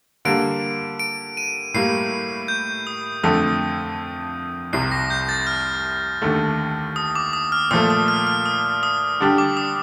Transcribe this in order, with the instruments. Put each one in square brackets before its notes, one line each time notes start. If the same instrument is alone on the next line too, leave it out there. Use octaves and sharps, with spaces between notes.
[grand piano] D3 G3 A#3 [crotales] D7
[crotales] D7
D#7
[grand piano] A2 G3 A#3 [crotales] C7
[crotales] G6
D#6
[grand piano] F2 D3 A3 [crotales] D#6
[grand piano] C2 C3 G3 [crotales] C7
[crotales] A#6
G6
A6
F6
[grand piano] D#2 D3 A3
[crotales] D#6
D6
D#6
F6
[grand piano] A#2 F3 A3 [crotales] D#6
[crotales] D#6
F6
F6
D#6
D#6
[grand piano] D3 G3 D4 G4
[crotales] D6
D#6